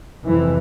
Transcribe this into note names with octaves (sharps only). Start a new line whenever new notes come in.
F2 C3 E3